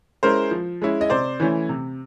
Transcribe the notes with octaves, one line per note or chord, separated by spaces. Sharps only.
G#3 C#4 E4 A#4 C5
F3
G#3 C#4 E4
D#5
C3 C5 D5
E3 A3 C#4 E4
C3